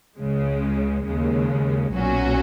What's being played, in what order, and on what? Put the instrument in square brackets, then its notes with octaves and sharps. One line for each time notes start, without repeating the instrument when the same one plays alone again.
[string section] C#2 C#3 G#3
D#2 C#3 G#3
B1 A#2 F#3 C#4 F#4